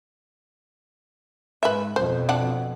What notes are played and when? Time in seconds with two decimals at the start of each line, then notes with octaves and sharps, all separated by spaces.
1.63 G#2 B4 E5
1.96 F2 B2 C5
2.29 C4 D4 F#5